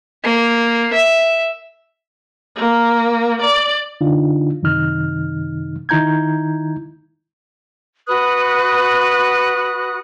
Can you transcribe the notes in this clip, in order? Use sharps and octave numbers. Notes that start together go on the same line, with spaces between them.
A#3
E5
A#3
D5
D3 D4 D#4 F4
F#2 C3 D#3 D#4 F6
D#3 D#4 E4 A#5 G6 G#6
F#4 B4 D#6 F#6